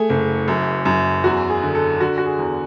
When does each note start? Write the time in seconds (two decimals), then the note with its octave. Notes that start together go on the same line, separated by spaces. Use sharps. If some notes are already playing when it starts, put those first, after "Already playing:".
Already playing: A3 G#4
0.10 F#1
0.48 F#2
0.85 F#2
1.24 E2 F#4
1.50 G#4
1.62 D3
1.75 A4
2.00 D3 F#4
2.18 F#4
2.26 G#4
2.39 E2